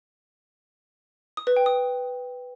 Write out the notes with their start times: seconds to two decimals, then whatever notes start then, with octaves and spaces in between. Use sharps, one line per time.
1.37 D#6
1.47 B4
1.56 G5
1.66 D#6